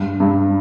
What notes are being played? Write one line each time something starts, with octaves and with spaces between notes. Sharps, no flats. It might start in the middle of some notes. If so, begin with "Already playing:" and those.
Already playing: G2
G2